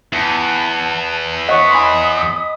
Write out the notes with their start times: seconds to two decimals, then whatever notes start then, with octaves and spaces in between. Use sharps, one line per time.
0.13 E2 A5
1.49 C#5 D#5 F#5 D#6 B6
1.71 G#5 B5 C6